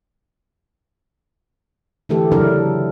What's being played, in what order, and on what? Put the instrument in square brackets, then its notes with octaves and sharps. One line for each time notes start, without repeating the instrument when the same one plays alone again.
[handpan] D3 E3 A3 G4 A4
C#3 F#3 D4 E4 A4 A#4